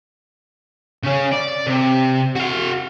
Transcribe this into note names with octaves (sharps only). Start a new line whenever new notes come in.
C#3 C#4
D5
C3
F#4 F5